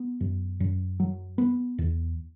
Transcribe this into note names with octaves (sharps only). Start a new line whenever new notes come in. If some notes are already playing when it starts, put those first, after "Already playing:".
Already playing: B3
F#2
F#2
F#3
B3
E2